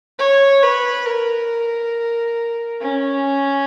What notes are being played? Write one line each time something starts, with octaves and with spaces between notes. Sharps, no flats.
C#5
B4
A#4
C#4